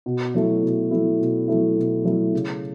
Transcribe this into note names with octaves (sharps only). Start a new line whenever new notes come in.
B2
F#3 A3 E4
B2
F#3 A3 E4
B2
F#3 A3 E4
B2
F#3 A3 E4
C#3